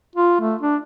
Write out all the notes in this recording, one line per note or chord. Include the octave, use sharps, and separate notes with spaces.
F4
A3
D4